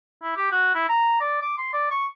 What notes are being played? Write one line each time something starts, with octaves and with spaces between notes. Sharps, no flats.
E4
G4
F#4
E4
A#5
D5
D6
C6
D5
C#6